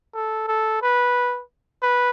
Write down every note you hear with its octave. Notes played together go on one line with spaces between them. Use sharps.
A4
A4
B4
B4